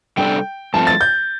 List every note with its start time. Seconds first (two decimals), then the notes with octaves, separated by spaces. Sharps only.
0.17 C3 G3 D4 A4 D5 G5
0.74 G2 F3 A3 C4 A5
0.87 A6
1.01 G6